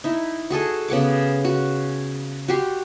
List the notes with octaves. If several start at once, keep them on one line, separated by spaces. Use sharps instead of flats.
D#4 E4
F#4 G#4 A4 D#5
C#3 B3 F#5 D6
F#4
F#4 G4 C6